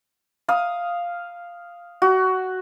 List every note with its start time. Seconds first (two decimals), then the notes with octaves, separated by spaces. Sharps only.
0.49 F5 D#6
2.02 F#4